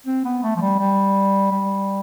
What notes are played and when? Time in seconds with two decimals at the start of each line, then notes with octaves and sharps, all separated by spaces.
0.07 C4
0.25 B3
0.43 A3
0.56 F3
0.61 G3
0.79 G3
1.51 G3